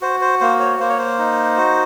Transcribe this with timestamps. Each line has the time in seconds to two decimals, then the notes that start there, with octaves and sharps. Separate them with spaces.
0.01 F#4 C5
0.21 C5
0.40 A#3 C5
0.60 C#5
0.79 A#3 C5
0.89 C#5
0.98 C5
1.18 D#4
1.57 F#4